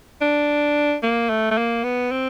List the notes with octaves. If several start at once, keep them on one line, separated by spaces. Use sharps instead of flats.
D4
A#3
A3
A3
A#3
B3
C4